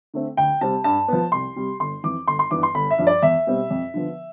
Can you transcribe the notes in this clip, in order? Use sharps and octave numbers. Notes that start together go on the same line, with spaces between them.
D3 A3 C4
D2 G5
C3 G3 C4 A5
G2 A5
F3 B3
C2 C6
C3 G3
G1 C6
F2 E3 D6
G1 C6
C6
G2 E3 B3 D6
C6
G1 B5
E5
G2 F3
D5
E2 E5
B2 G3 C4
F2
D3 F3 B3